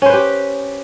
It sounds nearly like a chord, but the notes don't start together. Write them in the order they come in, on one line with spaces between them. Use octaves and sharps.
C#4 C5 B4 G4